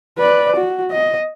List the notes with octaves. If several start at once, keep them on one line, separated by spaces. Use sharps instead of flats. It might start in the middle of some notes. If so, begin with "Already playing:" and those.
B4 D5
F#4
D#5